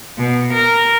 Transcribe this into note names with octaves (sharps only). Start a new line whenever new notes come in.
B2
A#4